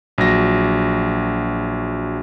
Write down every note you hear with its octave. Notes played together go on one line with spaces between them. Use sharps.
A#1 F#3 A#6